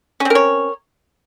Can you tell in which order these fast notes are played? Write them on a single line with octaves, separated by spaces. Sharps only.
C#4 C4 A#4 C#5